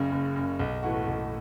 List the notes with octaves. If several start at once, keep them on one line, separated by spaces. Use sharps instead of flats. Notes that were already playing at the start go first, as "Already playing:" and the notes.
Already playing: F#1 F#2 C#3
F#1
F#2 C#3
B1
A2 E3 A3 F#4
B1